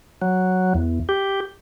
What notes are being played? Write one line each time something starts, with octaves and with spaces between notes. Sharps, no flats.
F#3
E2
G4